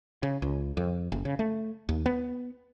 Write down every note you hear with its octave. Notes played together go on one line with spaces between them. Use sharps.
C#3
C#2
F2
F#1
C#3
A3
D#2
B3